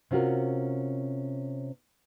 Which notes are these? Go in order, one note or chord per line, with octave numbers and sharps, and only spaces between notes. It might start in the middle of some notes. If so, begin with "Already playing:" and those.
C3 C#4 F4 F#4 A#4